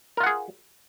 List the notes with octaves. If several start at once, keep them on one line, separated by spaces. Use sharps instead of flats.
F4 G#4 A#4 F#5